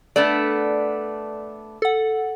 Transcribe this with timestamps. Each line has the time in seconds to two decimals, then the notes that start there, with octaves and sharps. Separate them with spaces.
0.16 A3 B3 D4 D5
1.82 A4 F#5